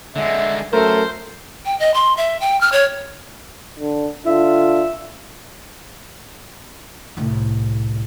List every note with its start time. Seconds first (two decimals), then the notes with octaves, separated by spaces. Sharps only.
0.16 D3 G#3 E5
0.73 F#2 A3 A#4 C5
1.65 G5
1.79 D#5
1.94 C6
2.17 E5
2.41 G5
2.61 F6
2.72 C#5
3.79 D3
4.26 D3 F4 E5
7.17 C2 A2